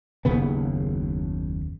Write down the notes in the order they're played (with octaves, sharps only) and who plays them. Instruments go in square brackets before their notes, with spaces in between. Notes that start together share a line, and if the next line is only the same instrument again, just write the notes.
[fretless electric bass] F#1 D#2 C#3 B3